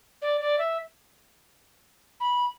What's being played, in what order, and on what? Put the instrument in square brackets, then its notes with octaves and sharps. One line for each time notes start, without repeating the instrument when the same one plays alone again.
[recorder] D5
D5
E5
B5